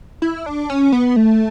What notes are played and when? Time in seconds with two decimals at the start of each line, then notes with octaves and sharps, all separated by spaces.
0.22 E4
0.46 D4
0.70 C#4
0.92 B3
1.16 A3